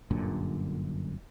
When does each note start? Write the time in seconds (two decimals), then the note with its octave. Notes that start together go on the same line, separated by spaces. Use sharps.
0.11 G1 F#2 A#2 D3